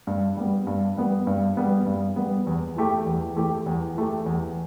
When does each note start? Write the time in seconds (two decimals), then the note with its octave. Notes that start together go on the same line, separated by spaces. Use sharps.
0.07 G2
0.37 G3 B3
0.67 G2
0.97 G3 B3
1.27 G2
1.57 G3 B3
1.86 G2
2.16 G3 B3
2.47 E2
2.76 E3 A3 G4
3.06 E2
3.36 E3 A3 G4
3.66 E2
3.96 E3 A3 G4
4.26 E2